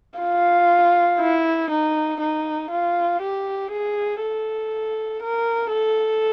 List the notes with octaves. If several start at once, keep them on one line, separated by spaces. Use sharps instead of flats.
F4
E4
D#4
D#4
F4
G4
G#4
A4
A#4
A4